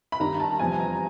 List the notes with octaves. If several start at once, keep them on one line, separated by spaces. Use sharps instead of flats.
B5
G2 D#3 G3 A#5
A5
E2 C3 F3 G#5
A#5